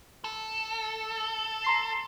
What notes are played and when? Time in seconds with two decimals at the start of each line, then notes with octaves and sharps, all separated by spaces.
0.24 A4
1.64 A#5 C6 C7